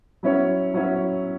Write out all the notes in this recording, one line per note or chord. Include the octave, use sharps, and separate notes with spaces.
F#3 C#4 E4 C#5
F#3 C#4 E4 C#5